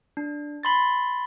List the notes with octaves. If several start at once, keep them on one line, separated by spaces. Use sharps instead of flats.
D4
B5 C6 A6